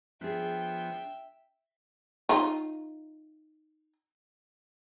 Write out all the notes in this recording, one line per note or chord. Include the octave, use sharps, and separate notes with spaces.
F3 B3 D4 G#4 E5 G5
D#4 F4